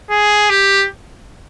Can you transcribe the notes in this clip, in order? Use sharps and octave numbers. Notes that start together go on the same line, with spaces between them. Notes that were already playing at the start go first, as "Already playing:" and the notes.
G#4
G4